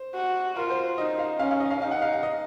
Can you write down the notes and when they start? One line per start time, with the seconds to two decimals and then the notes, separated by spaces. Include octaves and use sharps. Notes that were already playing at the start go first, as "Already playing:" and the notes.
Already playing: C5
0.15 F#4
0.56 F4 A#4
0.70 C5
0.98 D#4 D#5
1.19 F5
1.39 C#4 F5
1.51 F5
1.60 D#5
1.71 F5
1.82 D#4 F5
1.91 F#5
2.02 F5
2.13 F5
2.23 D#5